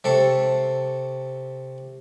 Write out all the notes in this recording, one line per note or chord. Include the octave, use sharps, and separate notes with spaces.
C3 A4 C#6